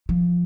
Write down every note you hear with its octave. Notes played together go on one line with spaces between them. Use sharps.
F3